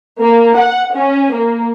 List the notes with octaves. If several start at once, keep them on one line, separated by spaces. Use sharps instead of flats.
A#3
F#5
C#4
A#3